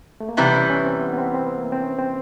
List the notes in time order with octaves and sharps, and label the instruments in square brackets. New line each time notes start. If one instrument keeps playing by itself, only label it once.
[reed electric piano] A3
A#3
[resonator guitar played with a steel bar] C3 E3 G3 [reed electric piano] B3
[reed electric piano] C#4
C#4
C4
B3
B3
C4
C4
B3
A#3
C4
C#4
C4